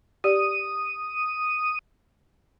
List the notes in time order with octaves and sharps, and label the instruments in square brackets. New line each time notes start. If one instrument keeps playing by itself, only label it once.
[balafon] G4 D5 [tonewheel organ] D#6